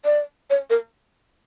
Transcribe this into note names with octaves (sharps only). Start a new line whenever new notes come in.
D5
C#5
A#4